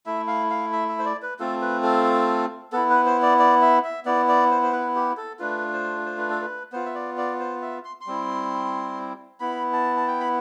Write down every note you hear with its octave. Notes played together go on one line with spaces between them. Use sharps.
A3 E4 E5
F5
F5
E5
E5
C5
D5
B4
A3 C4 F4 A4
B4
A4
B3 E4 A4
B4
C5
D5
D5
E5
E5
B3 E4 D5
D5
C5
C5
B4
G4
A4
A3 D4 F4 B4
C5
C5
B4
A4
B4
B3 F4 C5
E5
D5
D5
C5
E5
C6
C6
G3 C4 E4
B3 E4 B5
A5
A5
G5
B5